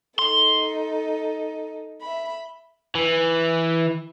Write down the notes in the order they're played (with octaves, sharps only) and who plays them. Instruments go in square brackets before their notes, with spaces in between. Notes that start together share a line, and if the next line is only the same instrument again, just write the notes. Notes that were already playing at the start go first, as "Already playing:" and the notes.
[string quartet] D#4 A4 [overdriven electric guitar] C6
[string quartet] E5 B5
[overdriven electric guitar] E3